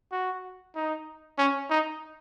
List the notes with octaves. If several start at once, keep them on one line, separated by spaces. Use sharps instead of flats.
F#4
D#4
C#4
D#4